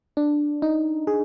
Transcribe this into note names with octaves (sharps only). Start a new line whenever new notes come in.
D4
D#4
G#4